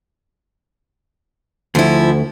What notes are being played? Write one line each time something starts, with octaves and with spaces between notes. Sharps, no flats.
D2 F3 E4